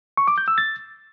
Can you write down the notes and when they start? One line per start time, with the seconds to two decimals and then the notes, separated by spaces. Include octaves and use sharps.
0.17 C#6
0.28 D6
0.38 G6
0.48 E6
0.58 A6